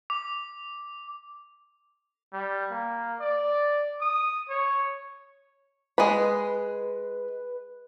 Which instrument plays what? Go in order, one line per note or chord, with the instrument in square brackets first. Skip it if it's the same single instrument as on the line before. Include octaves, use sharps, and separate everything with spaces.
[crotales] D6
[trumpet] G3
A#3
D5
D#6
C#5
[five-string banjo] G#3 G#4 B5 [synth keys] B4